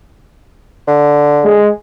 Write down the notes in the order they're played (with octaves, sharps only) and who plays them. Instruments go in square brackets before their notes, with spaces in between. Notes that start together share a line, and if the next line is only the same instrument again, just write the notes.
[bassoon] D3
[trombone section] G#3